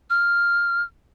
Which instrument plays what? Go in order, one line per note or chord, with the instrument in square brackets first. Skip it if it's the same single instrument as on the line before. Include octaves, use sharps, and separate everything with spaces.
[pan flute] F6